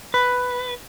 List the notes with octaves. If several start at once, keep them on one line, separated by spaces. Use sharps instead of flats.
B4